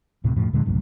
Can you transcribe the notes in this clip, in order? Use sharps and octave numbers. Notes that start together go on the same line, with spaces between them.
D2 A2 C3
F2 A2 F3
D2 A#2 D3 G#3
G1 C2 F#2 A2